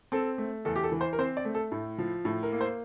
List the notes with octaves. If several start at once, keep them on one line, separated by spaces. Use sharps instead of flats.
C4 A4
A3
E2 A4
G4
A4
E3
C5
A#4
C4 C5
D5
A3
A4
A2
F3
A2
A#4
A#3
C5